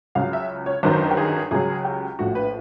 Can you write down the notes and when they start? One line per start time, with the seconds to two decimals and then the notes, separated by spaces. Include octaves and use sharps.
0.15 C#2 C#3 F#3 F5
0.33 E5
0.66 C#5
0.83 G1 F#2 D#3 F#3 C5
1.11 G4
1.17 G#4
1.51 C#2 C#3 F#3 G#4
1.84 G4
2.19 A#1 A2 F3 F#4
2.35 B4